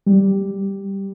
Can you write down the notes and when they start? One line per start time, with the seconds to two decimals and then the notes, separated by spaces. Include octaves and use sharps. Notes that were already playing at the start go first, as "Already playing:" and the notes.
0.06 G3